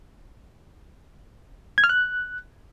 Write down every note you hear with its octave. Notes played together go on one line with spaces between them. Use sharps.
G#6
F6
F#6